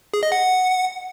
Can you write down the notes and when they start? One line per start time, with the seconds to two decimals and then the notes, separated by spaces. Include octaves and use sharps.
0.14 G#4
0.23 D#5
0.32 F#5